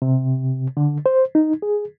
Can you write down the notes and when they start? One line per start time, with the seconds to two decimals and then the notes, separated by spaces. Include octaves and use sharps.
0.02 C3
0.77 D3
1.06 C5
1.35 D#4
1.62 G#4